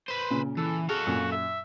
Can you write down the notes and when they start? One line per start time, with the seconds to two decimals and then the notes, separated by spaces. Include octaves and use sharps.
0.09 B4 C5
0.30 A#2 C#3
0.57 E3 A4
0.89 F#4 G#4 A4 F5
1.07 F#2 A#2
1.32 E5